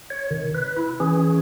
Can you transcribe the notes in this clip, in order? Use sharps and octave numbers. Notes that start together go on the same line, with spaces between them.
C#5
C3 D#3
B4
E4
E3 C#4 G#4